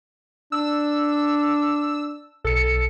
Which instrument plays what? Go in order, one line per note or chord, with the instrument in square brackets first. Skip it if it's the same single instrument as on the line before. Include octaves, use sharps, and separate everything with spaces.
[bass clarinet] D4 [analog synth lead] E6
[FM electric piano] B1 C#7 [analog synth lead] A4